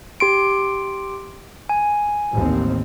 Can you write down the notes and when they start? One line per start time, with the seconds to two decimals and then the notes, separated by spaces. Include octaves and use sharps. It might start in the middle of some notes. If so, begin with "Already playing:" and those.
0.20 G4 C6 D7
1.69 G#5
2.33 A1 D#2 C4